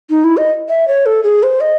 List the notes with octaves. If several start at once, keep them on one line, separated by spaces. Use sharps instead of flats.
D#4
E4
D#5
E5
C#5
A4
G#4
C5
D#5